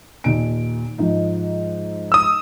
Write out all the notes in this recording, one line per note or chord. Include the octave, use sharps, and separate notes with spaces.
D#2 A#2 D7
G#2 F3 D#4
D#6 E6